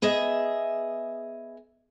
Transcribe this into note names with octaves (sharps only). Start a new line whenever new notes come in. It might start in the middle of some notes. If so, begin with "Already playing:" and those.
B3 G#4 D#5 E5